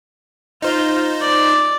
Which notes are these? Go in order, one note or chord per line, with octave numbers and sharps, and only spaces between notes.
D#4 F4 C5
D5